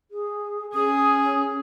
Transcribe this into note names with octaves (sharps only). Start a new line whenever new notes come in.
G#4
C#4 G#4 D#6